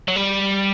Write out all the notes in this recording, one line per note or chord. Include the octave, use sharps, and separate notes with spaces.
F#3
G3